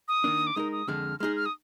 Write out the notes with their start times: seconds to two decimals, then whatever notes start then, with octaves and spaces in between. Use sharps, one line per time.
0.08 D#6
0.24 D#3 A#3 D4
0.47 D6
0.56 G#3 D#4 A#4 D#6
0.72 D#6
0.88 F2 D3 G#3 F6
1.20 G#3 D#4 G#4 F6
1.36 F6
1.46 D#6